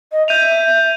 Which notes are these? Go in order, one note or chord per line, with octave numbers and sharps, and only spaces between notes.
D#5
E5 G6 D#7 F7